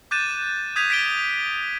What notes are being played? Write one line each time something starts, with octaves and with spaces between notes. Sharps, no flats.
D6 F#6 G6 A6 D#7 E7
D#6 G6 G#6 B6 D#7 F7
B6 D7 G7